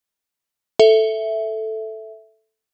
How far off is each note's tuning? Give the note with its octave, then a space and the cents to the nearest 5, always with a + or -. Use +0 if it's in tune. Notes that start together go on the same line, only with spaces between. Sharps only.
A4 +0 E5 +0